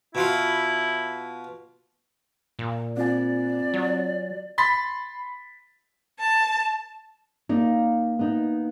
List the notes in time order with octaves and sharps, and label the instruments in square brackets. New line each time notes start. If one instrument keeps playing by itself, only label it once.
[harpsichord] B2 F4 [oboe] E4
[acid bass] A#2
[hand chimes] C4 F4 G#5 [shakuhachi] D5
[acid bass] F#3
[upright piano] B5 C6 A6 B6
[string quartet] A5
[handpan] A#3 [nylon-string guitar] D#4 D5
[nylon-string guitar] B3 D#4